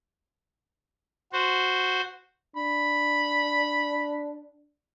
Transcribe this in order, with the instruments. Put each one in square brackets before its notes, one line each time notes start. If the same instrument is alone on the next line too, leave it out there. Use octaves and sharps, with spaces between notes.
[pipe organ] F#4 C5
[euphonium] D4 [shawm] B5